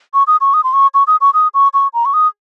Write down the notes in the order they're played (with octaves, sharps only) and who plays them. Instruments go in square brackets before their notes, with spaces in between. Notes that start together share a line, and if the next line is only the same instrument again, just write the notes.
[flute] C#6
D#6
C#6
D#6
C6
C#6
C#6
D#6
C#6
D#6
C#6
C#6
A#5
C#6
D#6